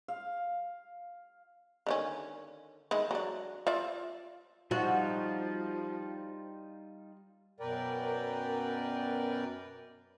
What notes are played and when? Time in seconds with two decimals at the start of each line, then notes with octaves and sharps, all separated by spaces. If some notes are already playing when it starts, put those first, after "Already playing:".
0.08 F5
1.87 D3 D#3 C#4
2.91 D#3 G#3 E4
3.11 F#3 D4
3.67 F4 D5 E5
4.71 F3 G3 D#4 F4 F#4
7.60 F#2 B2 A#4 B4 D5 G5